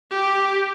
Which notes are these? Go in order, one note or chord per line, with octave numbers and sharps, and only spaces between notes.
G4